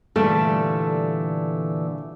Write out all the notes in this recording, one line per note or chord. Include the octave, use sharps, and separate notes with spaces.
A#2 D3 E3 G3 A3 A4